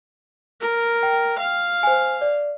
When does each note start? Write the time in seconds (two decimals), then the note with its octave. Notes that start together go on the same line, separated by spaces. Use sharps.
0.61 A#4
1.03 G5
1.39 F5
1.83 C5 G#5
2.21 D5